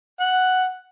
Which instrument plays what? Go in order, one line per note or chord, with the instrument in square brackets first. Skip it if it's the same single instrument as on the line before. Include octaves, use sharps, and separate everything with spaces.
[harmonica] F#5